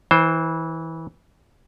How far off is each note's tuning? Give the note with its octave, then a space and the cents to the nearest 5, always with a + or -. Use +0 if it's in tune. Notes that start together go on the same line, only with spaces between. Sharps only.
E3 -20 C5 +5